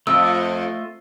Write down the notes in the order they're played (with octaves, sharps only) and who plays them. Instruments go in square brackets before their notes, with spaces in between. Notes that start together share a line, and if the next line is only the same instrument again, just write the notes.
[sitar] F2 [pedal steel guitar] A3 F4 D#5 [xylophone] E6